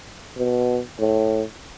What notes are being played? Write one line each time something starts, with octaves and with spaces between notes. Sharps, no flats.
B2
A2